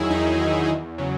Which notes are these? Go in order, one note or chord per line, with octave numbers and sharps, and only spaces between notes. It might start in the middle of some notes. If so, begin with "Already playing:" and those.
Already playing: E2 D#3 F#3 E4 G#4
E2 D#4
D#3 F#3
E2
C#3 F#3